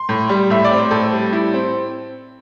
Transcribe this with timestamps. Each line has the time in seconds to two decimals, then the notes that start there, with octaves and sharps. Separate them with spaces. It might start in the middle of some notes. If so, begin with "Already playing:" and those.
Already playing: C6
0.09 A2
0.29 G3
0.50 A2 E5
0.64 D5
0.71 C4
0.78 C5
0.91 A2 A4
1.12 G3
1.33 E4
1.53 C4